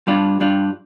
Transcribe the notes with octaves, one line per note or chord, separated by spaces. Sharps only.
G2 G3 D4 F4
G2 G3 D4 F4